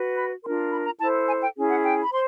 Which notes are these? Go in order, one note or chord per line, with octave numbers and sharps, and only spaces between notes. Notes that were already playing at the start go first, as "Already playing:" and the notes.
Already playing: F#4 B4
B5
D4 F4 A#4 C6
B5
A#5
E4 A4 C5 A5
G#5
G5
C#4 E4 G#4
F#5
G5
B5
C5 C6